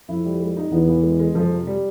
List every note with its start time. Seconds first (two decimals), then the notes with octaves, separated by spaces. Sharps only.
0.09 F2 E4
0.25 G3
0.40 G#3
0.57 D#4
0.72 E2 B3
0.88 E3
1.03 G#3
1.19 G#3
1.35 F2 F3
1.51 C3
1.67 G3